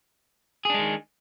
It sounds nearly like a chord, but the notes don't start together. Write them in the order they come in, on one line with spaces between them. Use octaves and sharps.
G#4 D4 G#3 D#3